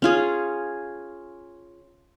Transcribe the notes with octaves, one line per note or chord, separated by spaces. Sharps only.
C#4 F4 G#4